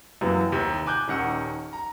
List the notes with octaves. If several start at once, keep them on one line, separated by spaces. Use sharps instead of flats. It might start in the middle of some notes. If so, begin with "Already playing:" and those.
F#2 C3 E3 A#3 B3
D#2 C3
G#5 D6 F#6 G6
D#1 D#3 C#4 F#5 E6
A#5